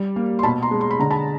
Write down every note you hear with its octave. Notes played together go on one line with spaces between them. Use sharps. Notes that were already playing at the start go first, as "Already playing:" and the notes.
Already playing: G3
A#3
C6
B2 A5 B5
A#5 C6
G#3
C6
B5
D3 A#5
A5 B5